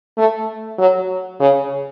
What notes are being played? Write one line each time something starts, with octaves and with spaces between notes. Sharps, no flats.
A3
F#3
C#3